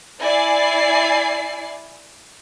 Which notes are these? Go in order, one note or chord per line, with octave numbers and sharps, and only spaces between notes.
E4 D5 G#5 C7